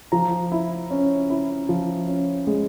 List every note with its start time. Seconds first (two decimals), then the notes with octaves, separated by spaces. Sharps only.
0.12 F3 A#5
0.52 E4
0.90 C#4
1.30 E4
1.69 F3
2.08 C#4
2.47 G#3